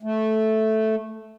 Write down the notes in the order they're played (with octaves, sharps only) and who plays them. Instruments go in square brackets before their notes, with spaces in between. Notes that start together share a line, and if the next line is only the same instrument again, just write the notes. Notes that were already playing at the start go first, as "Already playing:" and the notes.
[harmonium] A3